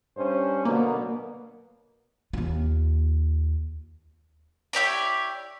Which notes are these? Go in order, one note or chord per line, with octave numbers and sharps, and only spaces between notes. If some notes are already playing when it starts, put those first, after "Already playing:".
G2 C#4 C5
B2 D3 F#3 A#3
D#2 F4
E4 G4 C#5 D5